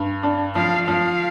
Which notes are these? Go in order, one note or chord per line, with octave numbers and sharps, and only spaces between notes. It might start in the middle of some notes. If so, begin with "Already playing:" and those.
Already playing: G2
D4
F3 F5
F3 F5